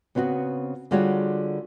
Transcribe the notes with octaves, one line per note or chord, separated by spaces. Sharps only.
C#3 B3 C4 F4 F#4
D3 G3 F4 F#4 G#4 C#5